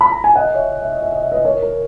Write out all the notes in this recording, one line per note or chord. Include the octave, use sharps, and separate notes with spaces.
B5
A#5
G#5
D#5 F#5
C#5 E5
D#5
E5
D#5
E5
D#5
E5
B4 D#5
A#4 C#5
A#4